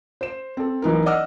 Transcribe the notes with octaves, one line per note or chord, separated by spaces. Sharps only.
C5 E7
C4 A4
B1 E3 D#4 A#4
D5 D#5 F#5 D6 E6 F6